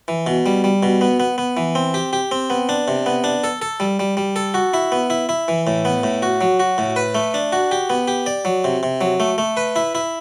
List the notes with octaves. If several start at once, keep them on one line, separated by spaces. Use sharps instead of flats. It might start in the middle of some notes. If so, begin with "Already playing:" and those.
E3
B2
G3
G3
B2
B3
B3
B3
E3
C4
G4
G4
C4
B3
D4
C3
B3
D4
A4
A4
G3
G3
G3
A4
F#4
E4
B3
E4
E4
E3
A2
B3
A2
F#4
F#3
F#4
A2
B4
A3
D4
F#4
G4
B3
G4
D5
F#3
C3
C3
F#3
A3
A3
B4
E4
E4